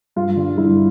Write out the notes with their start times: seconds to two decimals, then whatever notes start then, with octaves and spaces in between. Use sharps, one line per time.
0.16 G2 F4
0.36 D3 G3
0.58 G2 E4